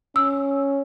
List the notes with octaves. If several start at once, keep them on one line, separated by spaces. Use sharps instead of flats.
C#4 E6